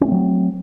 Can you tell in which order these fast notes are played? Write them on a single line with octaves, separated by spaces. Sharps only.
C#4 A3 C4 F#3